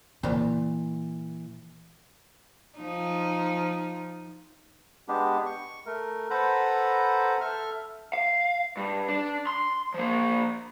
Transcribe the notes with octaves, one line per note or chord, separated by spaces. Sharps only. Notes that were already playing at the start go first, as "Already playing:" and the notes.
A#2 E3
F3 D#4
G#3 B3 D4 G4
C#6
A3 A#4
A4 B4 C5 F#5 A#5 B5
A4 E5 F6
F5
G2
D4
C6
F3 A#3